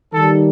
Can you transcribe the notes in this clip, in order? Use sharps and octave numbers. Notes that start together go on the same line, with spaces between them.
D#3 G3 D#4 A4